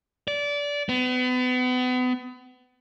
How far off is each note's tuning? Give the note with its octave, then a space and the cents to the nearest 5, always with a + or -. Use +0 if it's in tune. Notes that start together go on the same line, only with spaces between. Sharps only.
D5 -20
B3 +35